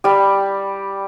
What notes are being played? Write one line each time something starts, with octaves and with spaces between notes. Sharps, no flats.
G3 G4